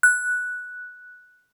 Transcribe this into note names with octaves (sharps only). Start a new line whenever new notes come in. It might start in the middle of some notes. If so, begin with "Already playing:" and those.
F#6